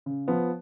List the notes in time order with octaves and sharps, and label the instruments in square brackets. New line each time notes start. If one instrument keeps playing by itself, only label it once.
[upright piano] C#3
F3 B3